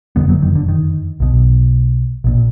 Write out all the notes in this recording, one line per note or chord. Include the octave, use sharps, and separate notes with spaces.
F#1 F2 D3 G#3 B3
F#3 A#3
D#3
D3
D#3
B1 B2
A#1 A#2